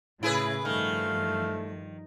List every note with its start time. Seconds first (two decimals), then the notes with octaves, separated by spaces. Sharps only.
0.23 A2 C#3 E4 G#4 B4
0.65 G2 D#3 F3 A3 F5